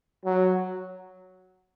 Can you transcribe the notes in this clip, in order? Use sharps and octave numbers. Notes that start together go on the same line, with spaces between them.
F#3